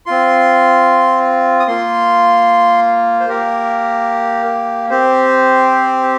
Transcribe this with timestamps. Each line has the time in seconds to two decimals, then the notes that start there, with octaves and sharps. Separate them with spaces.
0.06 C4 F4 C6
1.60 D#6
1.67 A#3 F4 C6
3.20 C5
3.29 A#3 G4 A#4
4.90 C4 G4 C5